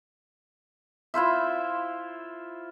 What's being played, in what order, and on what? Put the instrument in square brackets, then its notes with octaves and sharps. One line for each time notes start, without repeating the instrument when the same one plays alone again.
[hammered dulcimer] E4 F4 C5 E5